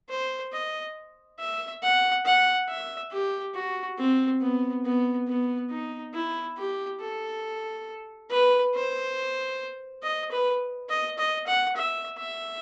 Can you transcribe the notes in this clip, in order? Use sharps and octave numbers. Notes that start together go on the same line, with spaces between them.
C5
D#5
E5
F#5
F#5
E5
G4
F#4
C4
B3
B3
B3
D#4
E4
G4
A4
B4
C5
D#5
B4
D#5
D#5
F#5
E5
E5